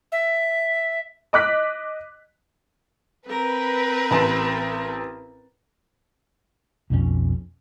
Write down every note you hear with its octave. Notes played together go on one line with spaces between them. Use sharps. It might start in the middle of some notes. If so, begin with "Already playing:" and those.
E5
D#5 D6 F#6 B6
C4 A#4 B4
A1 A5 C6
B1 F2 G3 C#4